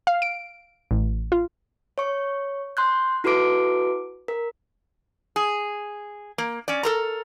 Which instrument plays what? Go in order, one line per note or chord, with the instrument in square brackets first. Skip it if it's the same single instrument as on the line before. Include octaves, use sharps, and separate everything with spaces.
[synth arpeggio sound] F5
D7
A1
F4
[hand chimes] C#5 C#6
C6 F#6 G6
E4 F#4 A4 B4 D6 D7
A#4
[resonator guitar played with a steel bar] G#4
A#3
C#4 D5
A4 A#4 A#5